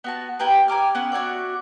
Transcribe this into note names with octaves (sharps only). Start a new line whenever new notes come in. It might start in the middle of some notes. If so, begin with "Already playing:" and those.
B3 F#4 A5
E4 G4 A#4 B4
G#5 A#5 D6 F6
B3 C#4 F#5
F#4 C#5 D5 E5